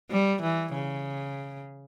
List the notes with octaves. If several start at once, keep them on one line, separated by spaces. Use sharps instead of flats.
G3
E3
C#3